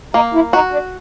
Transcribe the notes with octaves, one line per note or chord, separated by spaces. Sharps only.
A#3 D#4
E4
D#4 F#4
D4